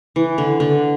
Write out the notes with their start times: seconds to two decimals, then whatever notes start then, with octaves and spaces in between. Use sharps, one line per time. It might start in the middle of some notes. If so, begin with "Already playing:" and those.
0.16 E3
0.38 D3
0.60 D3